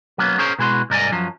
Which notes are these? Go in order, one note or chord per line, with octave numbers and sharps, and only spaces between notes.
F#3 A#3 B3 C#4
C#4 G#4 A#4 C5 C#5
B2 G#3 E4 F#4 C6
C2 G#2 A#4 D5 D#5 G#5
F#2 F3 F#3